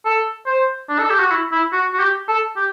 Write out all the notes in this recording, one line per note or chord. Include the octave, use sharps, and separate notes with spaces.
A4
C5
D4
A4
G4
F#4
E4
E4
F#4
F#4
G4
A4
G4